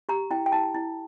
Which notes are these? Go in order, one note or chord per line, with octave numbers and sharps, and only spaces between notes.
G4 A#5
E4 G5
G5
E4 A5
E4